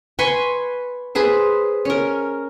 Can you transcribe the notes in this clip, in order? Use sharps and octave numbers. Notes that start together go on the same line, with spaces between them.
B4 G#5 C6 C#6
G#4 B4 C5
C#4 A#4